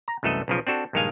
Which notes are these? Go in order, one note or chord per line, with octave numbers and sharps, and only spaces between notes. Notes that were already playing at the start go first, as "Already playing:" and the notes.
A#5
C2 F#2 E3 A3 A4 D#5
B1 C#3 F3
C4 D4 F#4 A4
A#1 G2 D#3 G#3 F5 G#5